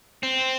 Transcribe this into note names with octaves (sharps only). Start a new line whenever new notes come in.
C4